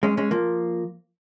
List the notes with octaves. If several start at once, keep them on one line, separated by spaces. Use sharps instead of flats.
G#3 C#4
G#3 C#4
F3 A#3